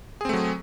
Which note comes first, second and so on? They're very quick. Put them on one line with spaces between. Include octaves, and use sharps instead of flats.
G#4 C4 A3 F#3